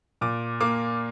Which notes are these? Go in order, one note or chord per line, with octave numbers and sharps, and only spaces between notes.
A#2 D6
A#3 D6